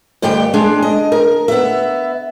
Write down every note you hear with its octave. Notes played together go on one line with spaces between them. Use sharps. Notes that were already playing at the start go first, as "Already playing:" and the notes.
D2 G2 D#3 G4 G5
G#3 D4 G#4
D#5
A#4
B3 E5